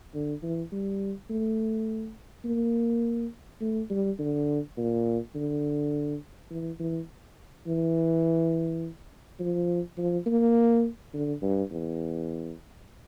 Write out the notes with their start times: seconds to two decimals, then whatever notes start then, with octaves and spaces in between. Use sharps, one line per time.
0.14 D3
0.43 E3
0.72 G3
1.30 A3
2.45 A#3
3.61 A3
3.90 G3
4.19 D3
4.77 A#2
5.35 D3
6.50 E3
6.80 E3
7.67 E3
9.40 F3
9.98 F3
10.26 A#3
11.14 D3
11.42 G2
11.71 E2